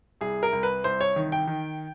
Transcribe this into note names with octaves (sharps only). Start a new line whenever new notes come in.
C2 G#4
A#4
C2
B4
C2 C5
C#5
D#3
G5
D#3